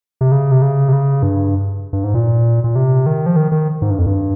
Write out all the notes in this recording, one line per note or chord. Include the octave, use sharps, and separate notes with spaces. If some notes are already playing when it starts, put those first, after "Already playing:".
C3
C#3
C3
C#3
C3
C#3
G2
G2
G#2
A#2
A#2
C3
D#3
F3
D#3
D#3
G#2
G2
F2
G2